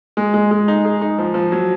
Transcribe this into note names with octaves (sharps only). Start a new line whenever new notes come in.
G#3
G#3
G#3
D#4
G#4
D#4
F3
F3
F#3